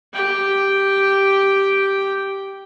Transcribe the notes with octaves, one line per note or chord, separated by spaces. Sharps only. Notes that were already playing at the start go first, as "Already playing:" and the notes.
G4 G5